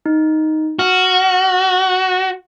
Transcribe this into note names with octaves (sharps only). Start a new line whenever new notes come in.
D#4
F#4 F6